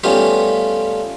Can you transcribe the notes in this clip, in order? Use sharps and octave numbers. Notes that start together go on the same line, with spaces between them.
G3 A3 B3 C#4 F4 G4